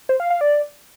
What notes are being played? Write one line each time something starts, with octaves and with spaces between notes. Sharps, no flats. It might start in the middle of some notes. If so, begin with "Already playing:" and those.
C5
F5
F5
D5